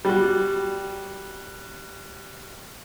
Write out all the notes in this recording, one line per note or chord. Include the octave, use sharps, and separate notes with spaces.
G3 F#4